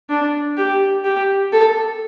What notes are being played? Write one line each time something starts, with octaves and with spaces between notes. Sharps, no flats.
D4
G4
G4
A4